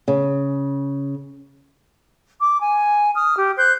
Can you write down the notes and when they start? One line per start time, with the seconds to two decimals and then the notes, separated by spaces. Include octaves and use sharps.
0.08 C#3
2.40 D6
2.60 G#5
3.14 D#6 F6
3.35 G4
3.57 C5 F#6 G6